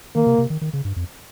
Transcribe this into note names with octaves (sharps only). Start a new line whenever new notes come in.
D#3 A#3
C3
C3
D#3
D#3
C#3
G2
F2